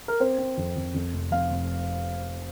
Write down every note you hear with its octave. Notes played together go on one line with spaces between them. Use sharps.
A#4
C4 C5
C4
F2
F2
F2
F1
F1 F5
F1